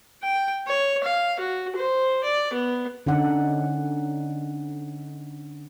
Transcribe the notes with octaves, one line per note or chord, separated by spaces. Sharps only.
G5
C#5
F5
F#4
C5
D5
B3
D3 C#4 D#4 F#5